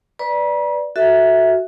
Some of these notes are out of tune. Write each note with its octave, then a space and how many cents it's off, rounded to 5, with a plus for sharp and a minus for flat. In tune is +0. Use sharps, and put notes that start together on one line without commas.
B4 +0 D5 +0 A#5 +45
F#4 +0 A4 +0 E5 -10